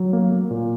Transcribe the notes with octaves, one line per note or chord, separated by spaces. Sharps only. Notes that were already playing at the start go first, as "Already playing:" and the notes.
Already playing: F#3
A#3
A#3
A#2